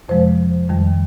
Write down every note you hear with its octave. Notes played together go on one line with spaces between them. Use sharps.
F2 C3 F3 G#3 C5
F2 D#3 G3